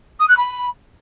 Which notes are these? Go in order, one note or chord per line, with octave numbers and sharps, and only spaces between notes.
D#6
F#6
B5